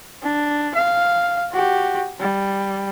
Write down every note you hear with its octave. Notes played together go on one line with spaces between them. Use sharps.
D4
F5
F#4 G4
G3